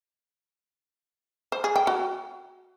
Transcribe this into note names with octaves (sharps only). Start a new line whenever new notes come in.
C5
G#4
G5
F#4